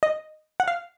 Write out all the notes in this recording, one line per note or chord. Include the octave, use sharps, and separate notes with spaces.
D#5
F#5
F5